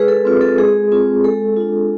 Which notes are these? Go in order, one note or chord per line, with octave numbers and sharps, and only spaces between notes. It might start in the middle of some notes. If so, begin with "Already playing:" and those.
Already playing: G#3 G#4 B4
A4
C4 F4
A4
G#3 G#4
C4 F4
G#3 A4
D4 F4